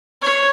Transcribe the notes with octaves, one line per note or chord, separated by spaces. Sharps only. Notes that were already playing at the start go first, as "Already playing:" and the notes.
C#5